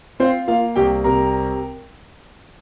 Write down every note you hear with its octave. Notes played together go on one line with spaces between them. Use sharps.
C4 F4 C5
A#3 F4 F5
C2 G4 G5
C3 A#4 A#5